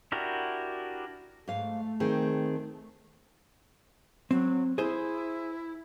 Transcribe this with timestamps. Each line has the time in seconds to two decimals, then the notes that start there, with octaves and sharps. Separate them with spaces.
0.12 D4 E4 F#4 G4 A#4
1.48 G#2 A3 F5
2.00 D#3 C4 G#4
4.31 F#3 C4
4.78 E4 G#4 C5